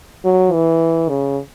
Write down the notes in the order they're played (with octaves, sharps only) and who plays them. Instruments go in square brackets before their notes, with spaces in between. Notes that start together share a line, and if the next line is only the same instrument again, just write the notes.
[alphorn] F#3
E3
C#3